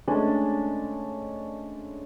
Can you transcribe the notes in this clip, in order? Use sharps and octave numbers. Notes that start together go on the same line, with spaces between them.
G#3 A3 C#4 D4